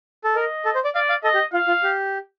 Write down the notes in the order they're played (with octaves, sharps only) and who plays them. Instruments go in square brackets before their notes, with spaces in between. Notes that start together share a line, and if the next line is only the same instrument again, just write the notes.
[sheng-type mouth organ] A4
[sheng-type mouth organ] A#4 [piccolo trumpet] D#5
[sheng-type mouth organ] A4
C5
D5
[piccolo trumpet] D5 [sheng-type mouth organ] F5
[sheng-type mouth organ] F5
[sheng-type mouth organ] A4 [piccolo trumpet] D#5
[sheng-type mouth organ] G4
[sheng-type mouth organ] F4 [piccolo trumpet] F5
[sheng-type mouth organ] F4
G4